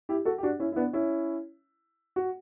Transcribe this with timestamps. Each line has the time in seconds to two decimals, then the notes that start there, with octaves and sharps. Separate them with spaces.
0.09 E4 G4
0.25 F#4 A4
0.38 G4
0.43 D4 F#4
0.60 C#4 E4
0.72 E4
0.76 B3 D4
0.93 C#4 E4
2.16 F#4